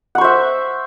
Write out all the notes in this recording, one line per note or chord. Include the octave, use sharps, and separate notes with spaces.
C5 E5 F#5 C#6